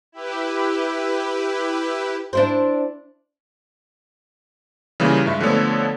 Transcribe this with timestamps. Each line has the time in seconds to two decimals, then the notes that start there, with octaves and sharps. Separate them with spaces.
0.12 E4 G4 B4
2.33 D4 E4 C5
5.00 C#3 E3 G3 A#3 F4 A#4
5.26 G2 G#3 E5
5.40 D3 F3 A3 B3 A4 C#5